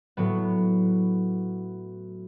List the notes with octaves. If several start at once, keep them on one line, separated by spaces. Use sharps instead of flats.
A2 F#3 B3